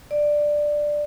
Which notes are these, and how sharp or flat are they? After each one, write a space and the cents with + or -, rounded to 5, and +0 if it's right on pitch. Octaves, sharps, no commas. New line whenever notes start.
D5 +10